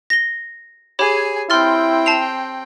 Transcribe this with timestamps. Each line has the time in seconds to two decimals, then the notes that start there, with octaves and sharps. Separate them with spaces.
0.10 A#6 G7
0.99 G4 G#4 C#5 G#5 B5
1.50 C4 E4 G5 C6 F6 A6
2.06 A5 C7 F7